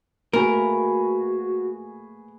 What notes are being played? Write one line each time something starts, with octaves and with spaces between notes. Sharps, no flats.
A3 A#3 F#4 G#4 A#4 B4 C#6